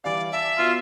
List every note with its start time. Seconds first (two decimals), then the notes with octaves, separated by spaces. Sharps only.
0.04 E3 G3 D5 F5
0.32 D5 E5 A5 D6
0.58 B3 F4 F#4